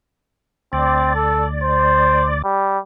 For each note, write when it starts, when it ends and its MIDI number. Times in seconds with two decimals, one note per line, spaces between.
0.73 2.42 38
0.73 1.13 60
0.73 2.42 74
1.15 1.45 69
1.63 2.29 72
2.44 2.79 55